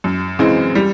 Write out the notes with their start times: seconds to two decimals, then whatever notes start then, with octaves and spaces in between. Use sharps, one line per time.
0.04 F#2
0.39 C#3 E3 G#3 C4
0.75 G3